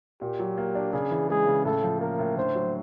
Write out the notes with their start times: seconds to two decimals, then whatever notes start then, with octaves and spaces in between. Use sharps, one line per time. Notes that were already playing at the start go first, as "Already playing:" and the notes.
0.21 A#2 G4
0.39 F#3
0.58 A#3
0.75 D4
0.93 C#3 G#4
1.11 E3
1.29 G#3 G#4
1.47 C#3
1.65 A2 A4
1.83 F3
2.01 A#3 A#4
2.19 A2
2.37 D3 C5
2.55 F#3